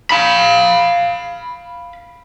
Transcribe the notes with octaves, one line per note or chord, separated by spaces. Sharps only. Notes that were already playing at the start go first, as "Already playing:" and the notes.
F5 B5